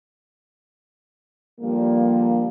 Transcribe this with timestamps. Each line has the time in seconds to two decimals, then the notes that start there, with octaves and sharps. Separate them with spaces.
1.61 D3 F3 G3 A#3